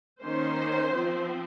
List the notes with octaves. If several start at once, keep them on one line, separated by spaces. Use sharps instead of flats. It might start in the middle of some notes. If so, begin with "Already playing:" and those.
D#3 A#3 C#4 C5
F3 C4